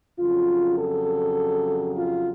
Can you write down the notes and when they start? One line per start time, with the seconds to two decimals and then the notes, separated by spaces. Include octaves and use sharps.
0.18 F2 C#3 F#3 F4
0.78 A4
1.97 F4